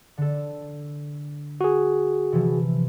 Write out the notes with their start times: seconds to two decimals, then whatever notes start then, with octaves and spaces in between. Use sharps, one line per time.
0.18 D3 A4
1.61 F#4 G#4
2.32 C3 E3 F3